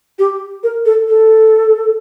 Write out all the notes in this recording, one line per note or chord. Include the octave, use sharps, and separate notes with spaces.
G4
A#4
A4
A4